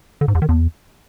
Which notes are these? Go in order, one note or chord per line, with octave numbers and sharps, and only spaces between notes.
D3
G#2
E2
D#3
E2